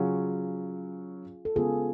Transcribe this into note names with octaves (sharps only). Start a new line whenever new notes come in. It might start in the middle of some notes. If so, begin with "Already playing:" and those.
Already playing: C#3 F#3 C#4 F4 G#4
A4
C#3 G#3 B3 F4 G#4